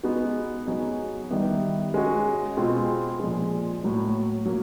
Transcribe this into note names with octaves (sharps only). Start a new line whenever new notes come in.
G#3 B3 D#4 F#4
F#3 B3 D#4 G#4
D#3 G3 B3 E4
G#3 C#4 F#4
B2 G#3 C4 F4
A#2 F3 G#3
A2 F#3 A#3
F#3 A#3